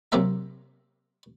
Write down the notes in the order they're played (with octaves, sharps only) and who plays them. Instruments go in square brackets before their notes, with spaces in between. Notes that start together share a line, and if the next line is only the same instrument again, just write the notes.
[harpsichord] C3 F#3 A#3 C5 E5 A#5